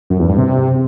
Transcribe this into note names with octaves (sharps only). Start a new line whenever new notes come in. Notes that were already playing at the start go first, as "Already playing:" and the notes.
F#2
E2
G2
C3